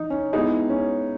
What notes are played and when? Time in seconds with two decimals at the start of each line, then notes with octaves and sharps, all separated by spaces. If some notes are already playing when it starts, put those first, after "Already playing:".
Already playing: E3 D#4
0.10 C#4
0.33 G#3 B3 D#4 E4 G#4
0.69 C#4